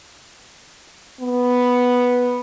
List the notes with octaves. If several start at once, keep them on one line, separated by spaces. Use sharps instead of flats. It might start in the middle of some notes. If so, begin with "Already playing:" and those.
B3